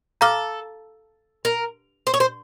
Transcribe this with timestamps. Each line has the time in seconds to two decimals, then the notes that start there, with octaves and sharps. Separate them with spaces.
0.21 A4 F5 A#5 D6 F6
1.45 A#4
2.07 C5
2.14 C#5
2.20 C5